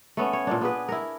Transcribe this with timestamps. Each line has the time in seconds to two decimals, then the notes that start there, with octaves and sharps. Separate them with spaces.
0.17 A3 B3 C#4
0.33 C#5
0.47 A#2 A#3 D4
0.61 B3 G#4 B4
0.89 E4 A#4